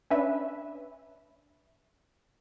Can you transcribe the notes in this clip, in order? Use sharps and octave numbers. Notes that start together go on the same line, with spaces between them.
C#4 D4 B4 E5